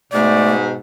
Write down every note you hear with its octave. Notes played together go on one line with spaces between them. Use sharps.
G#2 B2 A3 D5